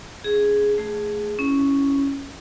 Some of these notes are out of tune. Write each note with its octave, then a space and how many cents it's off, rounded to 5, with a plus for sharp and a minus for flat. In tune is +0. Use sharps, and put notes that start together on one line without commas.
C#4 +0 G#4 +0
A3 +0 G#4 +0
C#4 +0 E4 +0